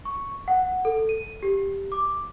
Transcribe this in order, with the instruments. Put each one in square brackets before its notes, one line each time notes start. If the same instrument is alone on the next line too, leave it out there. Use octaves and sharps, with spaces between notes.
[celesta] C#6
F#5
A4
D#7
G4
D6